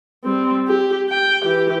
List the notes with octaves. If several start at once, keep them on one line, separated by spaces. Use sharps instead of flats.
G3 C4
G4
G5
E3 G4